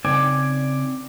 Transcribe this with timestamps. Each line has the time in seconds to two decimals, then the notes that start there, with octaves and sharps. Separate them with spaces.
0.05 C#3 C4 D#4 D5 G#5